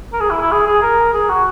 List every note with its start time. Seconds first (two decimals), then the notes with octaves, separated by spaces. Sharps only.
0.13 A#4
0.20 G#4
0.30 E4
0.42 E4
0.52 G#4
0.66 G#4
0.82 A#4
1.14 G#4
1.30 F#4